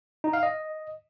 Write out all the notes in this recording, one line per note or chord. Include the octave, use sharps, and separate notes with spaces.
D#4
F5
D#5